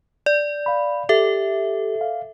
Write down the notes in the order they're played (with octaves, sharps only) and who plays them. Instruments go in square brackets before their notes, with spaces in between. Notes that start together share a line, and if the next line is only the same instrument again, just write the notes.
[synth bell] D5
[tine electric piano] F5 B5
[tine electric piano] G4 [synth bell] A4 E5
[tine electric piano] F5